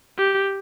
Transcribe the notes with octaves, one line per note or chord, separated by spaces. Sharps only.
G4